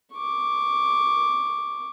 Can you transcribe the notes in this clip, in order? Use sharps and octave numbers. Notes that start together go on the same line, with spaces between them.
C#6 D6